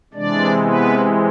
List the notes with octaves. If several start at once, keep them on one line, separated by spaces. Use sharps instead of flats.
C3 E3 G#3 D4 D5
B3 B4